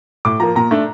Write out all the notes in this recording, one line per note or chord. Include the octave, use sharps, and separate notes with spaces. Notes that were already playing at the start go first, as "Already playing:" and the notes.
A2 D6
F3 A#3 A#5
A#2 A#5
A3 D4